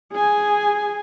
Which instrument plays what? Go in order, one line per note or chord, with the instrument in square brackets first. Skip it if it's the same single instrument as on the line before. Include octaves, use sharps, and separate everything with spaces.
[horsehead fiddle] G#4 G#5